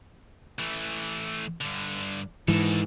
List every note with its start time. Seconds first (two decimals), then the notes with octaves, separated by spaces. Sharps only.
0.59 E3 A3
1.61 G2 D3
2.48 G#2 D#3 E3 A4